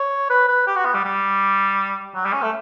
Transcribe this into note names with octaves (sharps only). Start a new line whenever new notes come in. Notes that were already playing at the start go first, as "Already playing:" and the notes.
Already playing: C#5
B4
B4
G4
F#4
B3
G3
G3
F#3
G3
C#4
A3